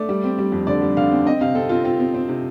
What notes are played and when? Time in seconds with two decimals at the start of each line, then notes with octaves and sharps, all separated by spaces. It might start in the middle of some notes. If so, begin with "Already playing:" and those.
Already playing: A3 D5
0.09 G3
0.24 C4
0.39 G3
0.52 F2
0.67 D3 D5
0.82 G3
0.97 D3 F5
1.12 C4
1.26 C4 D#5
1.41 C3 F5
1.55 C4 A4
1.69 C4 F4
1.84 C4 F4
2.00 C4
2.14 C4
2.29 C3